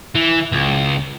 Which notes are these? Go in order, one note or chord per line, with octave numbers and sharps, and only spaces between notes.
E3
C#2